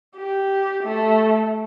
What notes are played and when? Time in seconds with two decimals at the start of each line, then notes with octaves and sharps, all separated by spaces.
0.16 G4
0.83 A3